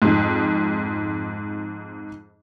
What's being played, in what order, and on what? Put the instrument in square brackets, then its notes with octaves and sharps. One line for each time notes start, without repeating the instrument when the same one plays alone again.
[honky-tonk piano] F2 G#2